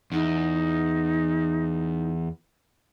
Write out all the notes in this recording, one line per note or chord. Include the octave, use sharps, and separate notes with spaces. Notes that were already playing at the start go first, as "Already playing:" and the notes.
E2 D#4